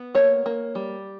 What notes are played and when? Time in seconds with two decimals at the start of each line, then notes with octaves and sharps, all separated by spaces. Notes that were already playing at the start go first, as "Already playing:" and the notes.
Already playing: B3
0.15 A#3 C#5
0.46 A#3
0.75 G3